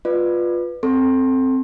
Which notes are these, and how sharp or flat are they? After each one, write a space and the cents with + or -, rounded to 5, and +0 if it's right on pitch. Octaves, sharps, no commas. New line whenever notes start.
F4 +10 B4 +0 D5 +30
C4 +0 A4 +0 C6 +30